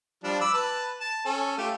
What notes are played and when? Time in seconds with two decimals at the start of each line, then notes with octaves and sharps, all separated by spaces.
0.24 F3 G3 D4
0.41 B5 D6 E6
0.54 B4 A5
1.00 A5
1.25 C#4 A4
1.58 A3 F4 G4